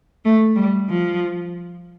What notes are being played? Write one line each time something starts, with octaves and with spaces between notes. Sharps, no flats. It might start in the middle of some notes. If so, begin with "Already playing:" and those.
A3
G3
F3